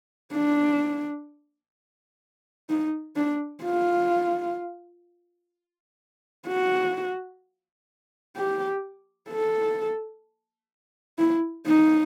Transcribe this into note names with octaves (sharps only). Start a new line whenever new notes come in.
D4
D#4
D4
F4
F#4
G4
A4
E4
D#4